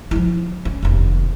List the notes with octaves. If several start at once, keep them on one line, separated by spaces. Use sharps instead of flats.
F3 E4
C#4
F1 D#2